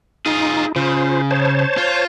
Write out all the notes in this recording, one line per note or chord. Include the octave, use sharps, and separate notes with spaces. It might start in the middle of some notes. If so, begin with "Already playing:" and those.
D#4 F4 G#4
C#3 F4 C5
C5 C#5 A5
F4